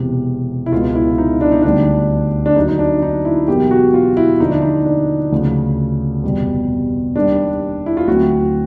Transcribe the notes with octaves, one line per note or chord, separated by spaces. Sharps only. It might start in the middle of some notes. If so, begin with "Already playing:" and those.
Already playing: E1 E2 C3
E4
C#2 B2 G#3 B3 F4
E4
D#4
D4
D#4
D2 D3 G3 C4 D4
D4
D#2 D3 F#3 D#4
D#4
D4
D#4
E4
E1 E2 B2 F#3 A#3 G4
F#4
F4
E4
D#2 D3 F3 D#4
D4
D#4
D4
D2 C#3 F3
F1 E2 B2 G3
D#2 D#3 G3 D4
E4
F4
D2 D3 F#3 A3 C4 F#4